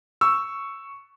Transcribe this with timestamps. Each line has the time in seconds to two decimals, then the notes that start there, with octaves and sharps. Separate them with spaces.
0.21 C#6 E6